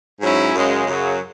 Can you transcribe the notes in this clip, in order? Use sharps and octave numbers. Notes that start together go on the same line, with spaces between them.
G#2 F#3 C#4 E4
F#2 C#3 G#3
F#2 C#3 F#3